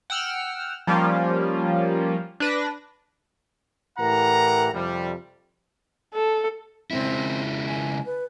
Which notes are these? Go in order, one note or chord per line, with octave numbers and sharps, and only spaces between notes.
F#5 G5 E6 F6
F3 G3 A#3 C#4 F4
D4 B4 A#6
A2 E3 G4 A#4 F#5 A#5
F2 C3 G3
A4
C#3 G#3 C4 E4
G#5
B4